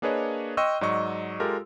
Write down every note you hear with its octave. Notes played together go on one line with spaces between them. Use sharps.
A#3 D4 G#4 B4 C#5 D#5
D#5 G5 C6 C#6 E6 F#6
G#2 F#3 D5 D#5 C#6
G#3 F4 G4 A4 A#4